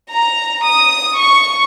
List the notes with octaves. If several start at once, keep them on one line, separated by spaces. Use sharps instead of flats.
A#5
D#6
C#6